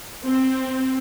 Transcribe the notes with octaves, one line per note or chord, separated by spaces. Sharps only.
C4